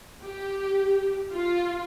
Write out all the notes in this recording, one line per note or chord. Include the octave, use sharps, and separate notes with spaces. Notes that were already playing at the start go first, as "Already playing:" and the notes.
G4
F4